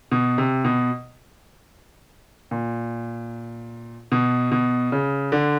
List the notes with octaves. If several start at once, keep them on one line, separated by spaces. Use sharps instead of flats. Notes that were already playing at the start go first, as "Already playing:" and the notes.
B2
C3
B2
A#2
B2
B2
C#3
D3